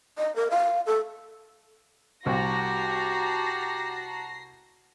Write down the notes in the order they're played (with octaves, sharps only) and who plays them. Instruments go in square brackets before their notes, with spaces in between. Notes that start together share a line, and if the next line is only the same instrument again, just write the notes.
[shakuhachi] D#5
A#4
F5
A4
[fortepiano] C2 [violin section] F#4 A5 A#5 [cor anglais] G4 [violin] A#6 C7